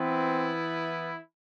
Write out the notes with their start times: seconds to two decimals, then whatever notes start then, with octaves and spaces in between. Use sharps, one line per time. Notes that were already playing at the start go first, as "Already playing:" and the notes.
Already playing: E3 B3 C4 E4